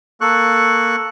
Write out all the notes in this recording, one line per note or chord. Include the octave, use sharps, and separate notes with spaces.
A#3 A4 C#6 F#6